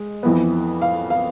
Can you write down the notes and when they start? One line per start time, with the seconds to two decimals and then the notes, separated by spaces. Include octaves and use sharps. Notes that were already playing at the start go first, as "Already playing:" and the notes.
Already playing: G#3
0.23 F2 E3 B3
0.82 F5
1.10 F5